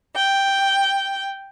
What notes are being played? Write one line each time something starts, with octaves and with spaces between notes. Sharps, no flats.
G5